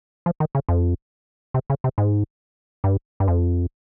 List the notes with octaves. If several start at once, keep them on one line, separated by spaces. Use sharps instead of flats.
F3
D#3
C#3
F2
C3
C#3
C3
G#2
G2
G2
F2